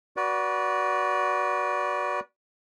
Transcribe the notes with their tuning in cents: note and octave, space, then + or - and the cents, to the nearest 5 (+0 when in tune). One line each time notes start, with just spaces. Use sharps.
F#4 +5 B4 -30 D5 -15